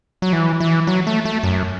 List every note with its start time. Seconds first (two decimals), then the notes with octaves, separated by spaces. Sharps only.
0.22 F#3
0.33 E3
0.60 E3
0.87 F#3
1.07 A3
1.25 A3
1.43 F#2